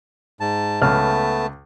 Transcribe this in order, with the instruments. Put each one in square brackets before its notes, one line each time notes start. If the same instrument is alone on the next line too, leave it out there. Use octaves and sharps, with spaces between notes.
[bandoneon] G#2 A5
[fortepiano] C#2 F6 [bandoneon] A3 B3 A5